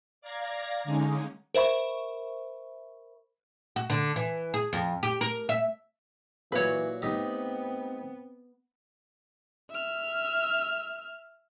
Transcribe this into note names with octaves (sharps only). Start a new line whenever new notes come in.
D5 F5 A#5 G#6 A#6
D3 G#3 C#4 D#4
A#4 C5 E5 B5 C#6
F#4
D3
E3
G#4
F2
G4
A#4
E5
A#2 E3 F#3 B4 C#5
A3 B3 C4 D#4 G4
E5 F6